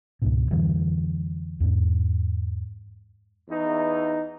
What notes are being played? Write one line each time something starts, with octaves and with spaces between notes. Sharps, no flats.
C#2 G#2 B2
F2 D3 E3 G3
E2 G#2
E2 D#4